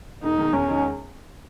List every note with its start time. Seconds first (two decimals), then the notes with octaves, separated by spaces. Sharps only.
0.23 E1 D#4
0.38 E2 D#3
0.53 E2 C#4
0.68 D#3 G#3 D#4 G#4